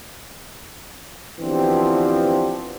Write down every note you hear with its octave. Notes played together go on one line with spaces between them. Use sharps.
B2 D3 E3 F3 C4 G4